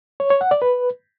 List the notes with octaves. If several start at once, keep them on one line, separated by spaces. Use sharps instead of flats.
C#5
C#5
F#5
D5
B4